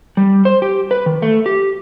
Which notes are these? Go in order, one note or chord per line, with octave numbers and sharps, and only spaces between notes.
G3
C5
G4
B4
D#3
A3
G4